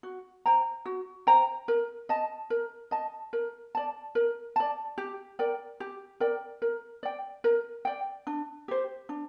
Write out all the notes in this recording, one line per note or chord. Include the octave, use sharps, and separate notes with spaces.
F#4
C5 G5 A#5
F#4
C5 G5 A#5
A#4
D#5 A5
A#4
D#5 A5
A#4
D5 A5
A#4
D5 A5
G4
A#4 D5 G5
G4
A#4 D5 G5
A#4
D5 G5
A#4
D5 G5
D4
G4 C5
D4